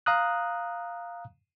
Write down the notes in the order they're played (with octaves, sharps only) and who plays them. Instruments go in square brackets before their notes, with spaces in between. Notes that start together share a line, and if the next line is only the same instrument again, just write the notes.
[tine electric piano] F5 A#5 D#6 F#6